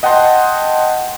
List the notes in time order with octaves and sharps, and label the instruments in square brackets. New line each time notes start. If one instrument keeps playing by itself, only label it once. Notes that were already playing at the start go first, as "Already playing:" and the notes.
[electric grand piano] D#5 F#5 G5 A5 C6